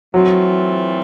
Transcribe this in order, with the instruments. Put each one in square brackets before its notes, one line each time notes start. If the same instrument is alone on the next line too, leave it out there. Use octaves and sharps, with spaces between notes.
[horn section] E3 A3 C4 F4 [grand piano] F#3